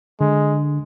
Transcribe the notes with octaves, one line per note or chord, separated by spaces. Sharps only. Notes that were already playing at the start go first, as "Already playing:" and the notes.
D3 G#3